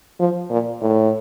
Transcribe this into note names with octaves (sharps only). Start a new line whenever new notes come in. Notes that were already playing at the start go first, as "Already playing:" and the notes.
F3
A#2
A2